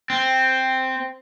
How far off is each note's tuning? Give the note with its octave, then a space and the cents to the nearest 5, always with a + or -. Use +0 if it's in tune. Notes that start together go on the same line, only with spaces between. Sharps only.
C4 +0